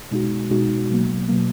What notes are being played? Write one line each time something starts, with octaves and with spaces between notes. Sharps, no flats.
B2 G#3 D#4 F#4
B2 G#3 D#4 F#4
B2 F#3 A#3
B2 F#3 A#3